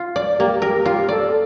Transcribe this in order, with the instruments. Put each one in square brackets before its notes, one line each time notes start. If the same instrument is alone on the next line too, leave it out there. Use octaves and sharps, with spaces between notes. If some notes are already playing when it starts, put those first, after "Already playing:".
Already playing: [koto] F4
D5
[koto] A#3 [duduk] G4
[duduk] G4 [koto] A#4
[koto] F4 [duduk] G4
[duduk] A4 [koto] D5